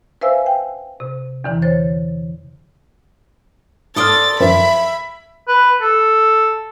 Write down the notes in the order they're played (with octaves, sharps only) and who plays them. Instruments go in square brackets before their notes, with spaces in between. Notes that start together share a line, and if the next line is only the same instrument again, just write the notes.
[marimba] B4 C5 E5 F5 G#5 E6
G5
C3
E2 D3 E3
C5 C#5 A6
[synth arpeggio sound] G#2 F6 [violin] A4 A6 [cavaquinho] D5 C6 D#6
[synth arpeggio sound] F#2 D#3 F3 [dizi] E5 [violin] B5
[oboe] B4
A4